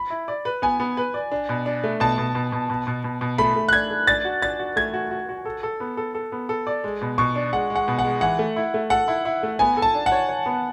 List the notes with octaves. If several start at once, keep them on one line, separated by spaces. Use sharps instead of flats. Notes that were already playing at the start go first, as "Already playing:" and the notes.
Already playing: B5
E4
D5
B4
B3 G#5
B3
B4
D5
D4
B2
D4
A3
B2 A5
B2
B2
B2
B2
B2
B2
B2
A3 B5
A3
F#6
D4 G#6
A3
D4 A6
F#4
D4 A6
F#4
A3 G#6
F#4
F#4
F#4
A4
A4
B3
A4
A4
B3
A4
D5
G#3
B2
B2 C#6
D4
G#3 F#5
G#3
F#5
B2
F#5
G#3
E3 F#5
A3
E4
A3
A4 F#5
E4
E4
A3
B3 G#5
A4
A5
D4
F#5
C#5
C#5
B3